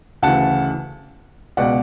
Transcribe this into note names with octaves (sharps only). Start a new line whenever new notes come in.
D2 C#3 E3 F#5 A5
C#2 B2 D5 F#5